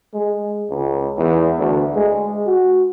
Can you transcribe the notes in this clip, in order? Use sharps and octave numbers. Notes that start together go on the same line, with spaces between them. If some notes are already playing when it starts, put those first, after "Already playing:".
G#3
C#2
E2
D2
G#3
F#4